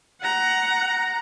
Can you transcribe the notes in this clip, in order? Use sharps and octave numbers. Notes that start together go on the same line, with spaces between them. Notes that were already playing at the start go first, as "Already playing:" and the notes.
F#5 A#5